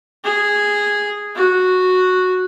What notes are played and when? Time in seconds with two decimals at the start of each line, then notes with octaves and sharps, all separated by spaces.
0.24 G#4
1.35 F#4